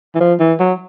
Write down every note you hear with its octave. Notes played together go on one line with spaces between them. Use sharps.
E3
F3
E3
F#3